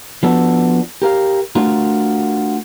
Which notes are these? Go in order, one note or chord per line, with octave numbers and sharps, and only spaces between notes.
F3 B3 D4 F#4 A4
G4 A#4 F5
A3 D4 F4 F#4 A#4